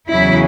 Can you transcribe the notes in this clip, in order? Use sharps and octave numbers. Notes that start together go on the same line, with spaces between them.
E2 C#3 F#3 E4